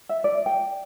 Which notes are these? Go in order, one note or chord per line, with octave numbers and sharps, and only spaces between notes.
E5
D5
G5